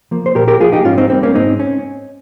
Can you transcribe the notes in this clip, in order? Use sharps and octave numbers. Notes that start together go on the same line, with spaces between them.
F3 A#3
C5
A#2 G4 A#4
G4 A#4
F3 A#3 F4 G#4
D#4 G4
G#2 C#4 F4
C4 D#4
G3 A#3 C4
A#3 C#4
G#2 C4 D#4
C#4